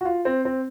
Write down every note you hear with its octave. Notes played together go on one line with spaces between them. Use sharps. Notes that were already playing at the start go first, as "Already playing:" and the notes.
F#4
F4
C4
C4